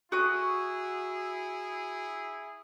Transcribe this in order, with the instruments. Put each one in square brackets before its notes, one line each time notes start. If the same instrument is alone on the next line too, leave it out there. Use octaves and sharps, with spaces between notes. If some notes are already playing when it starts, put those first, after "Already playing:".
[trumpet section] E4 G#4 [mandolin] F#4 D#6